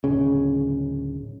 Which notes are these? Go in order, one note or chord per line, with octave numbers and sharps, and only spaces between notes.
D1 C#3